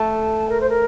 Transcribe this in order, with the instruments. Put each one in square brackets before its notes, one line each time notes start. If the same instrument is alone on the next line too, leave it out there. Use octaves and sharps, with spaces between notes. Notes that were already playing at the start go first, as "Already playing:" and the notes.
Already playing: [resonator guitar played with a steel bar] A3 [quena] A5
[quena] A#4
C5
A#4